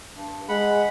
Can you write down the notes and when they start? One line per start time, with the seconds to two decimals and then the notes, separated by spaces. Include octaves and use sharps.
0.15 G2
0.49 G#3 F#5 B5